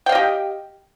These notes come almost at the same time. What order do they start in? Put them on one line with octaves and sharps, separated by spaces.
G5 F5 D#5 G4